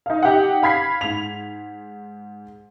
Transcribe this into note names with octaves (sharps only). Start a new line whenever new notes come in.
D#4 F5
D#4 G4 F#5
F5 B5 G#6 B6 C7
G#2 F7